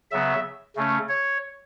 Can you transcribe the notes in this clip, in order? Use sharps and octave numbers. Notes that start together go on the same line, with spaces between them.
C#3 F#3 B3 E5
C#3 A3 C#4
C#5